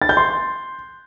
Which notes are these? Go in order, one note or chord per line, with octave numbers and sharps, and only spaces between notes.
A6
G6
C6